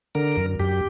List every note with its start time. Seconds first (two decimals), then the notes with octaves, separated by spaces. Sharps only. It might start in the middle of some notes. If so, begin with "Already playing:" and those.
0.15 D3 A#4
0.37 F#2
0.59 F#2 G4